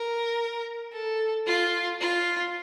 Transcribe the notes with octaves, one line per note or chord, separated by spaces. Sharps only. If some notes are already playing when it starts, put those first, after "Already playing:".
Already playing: A#4
A4
F4
F4